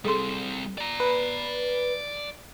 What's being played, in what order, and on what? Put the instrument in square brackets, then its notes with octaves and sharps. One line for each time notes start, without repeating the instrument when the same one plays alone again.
[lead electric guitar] G3 C4 [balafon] G#4 A4 C6
[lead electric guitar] D5 A#5
[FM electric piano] B4